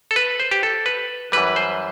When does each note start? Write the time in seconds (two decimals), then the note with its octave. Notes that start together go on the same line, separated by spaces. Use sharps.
0.11 A4
0.16 B4
0.40 C5
0.51 G4
0.63 A4
0.86 B4
1.32 F#2 E3 G3 B4
1.56 C5